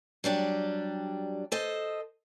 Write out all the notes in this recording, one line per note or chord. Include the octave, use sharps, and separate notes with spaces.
F#3 G3 D4 G4
A4 C5 D#5